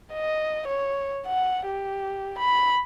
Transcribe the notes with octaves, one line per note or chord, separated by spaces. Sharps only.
D#5
C#5
F#5
G4
B5